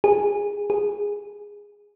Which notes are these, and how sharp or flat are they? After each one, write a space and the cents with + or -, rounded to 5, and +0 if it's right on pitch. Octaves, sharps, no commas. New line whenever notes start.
G#4 -20
G#4 -10